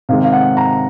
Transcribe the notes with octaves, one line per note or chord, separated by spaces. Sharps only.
C3 D#3 G#3 F5
F5
F#5
A#5